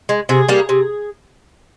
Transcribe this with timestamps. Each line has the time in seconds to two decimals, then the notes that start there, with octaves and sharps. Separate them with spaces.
0.09 G#3
0.29 C3 G#4
0.49 G3 A#3
0.69 C3